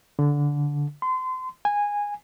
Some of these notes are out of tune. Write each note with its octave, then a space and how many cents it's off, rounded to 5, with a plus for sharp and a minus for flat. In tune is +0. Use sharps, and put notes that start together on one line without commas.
D3 -15
C6 -30
G#5 -15